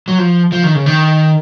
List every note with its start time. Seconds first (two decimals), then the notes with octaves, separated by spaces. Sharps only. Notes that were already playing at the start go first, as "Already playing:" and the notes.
0.08 F#3
0.18 F3
0.52 F3
0.63 D#3
0.75 C#3
0.86 D#3